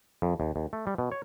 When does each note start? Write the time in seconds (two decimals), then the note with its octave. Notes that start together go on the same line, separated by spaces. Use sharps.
0.22 F2
0.40 D#2
0.56 D#2
0.73 A3
0.87 G3
0.98 B2
1.12 C#5